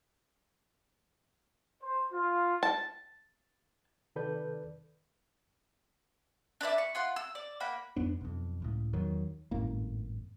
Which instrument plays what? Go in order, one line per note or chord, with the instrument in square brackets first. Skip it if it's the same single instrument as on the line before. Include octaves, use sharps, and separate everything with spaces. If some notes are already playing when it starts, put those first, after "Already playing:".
[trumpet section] C5
F4
[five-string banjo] A5
[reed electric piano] C3 D#3 A4 B4 D5 G6
[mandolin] D4 B4 D5 E5
C#6
F4 F#5 C6
E6
D5
A#3 F#5 G5 B5
[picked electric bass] F2 B3 D4
B1 F2
C#2 A2
E2 D#3 F#3
[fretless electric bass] G#1 F#2 A2 A#3